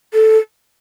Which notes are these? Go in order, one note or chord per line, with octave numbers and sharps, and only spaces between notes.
A4